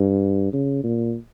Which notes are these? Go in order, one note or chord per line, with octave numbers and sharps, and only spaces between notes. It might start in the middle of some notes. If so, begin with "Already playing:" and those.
Already playing: G2
C#3
A#2